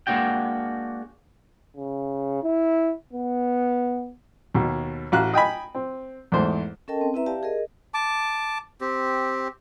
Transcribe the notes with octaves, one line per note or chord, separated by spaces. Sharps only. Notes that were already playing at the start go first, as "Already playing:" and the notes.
G#3 A#3 C4 D4 F#4 G5
C#3
E4
B3
D#2 B2
A1 F#4 F5 F#6
D#5 G5 G#5 B5
C4
E2 G#2 A3 C5
C#4 A4 A#4 D#5 G5 A5
C4
C4 E4 B4 E5 A#5
G4 D5 E5 F5 G5 A5
G#4 A#4 D#5
A5 D6
C4 G4